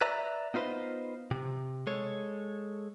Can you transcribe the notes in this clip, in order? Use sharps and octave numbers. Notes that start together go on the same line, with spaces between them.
B4 D5 E5 A#5
B3 D#4 F4 B4 C5 D#5
C3
G#3 A4 C#5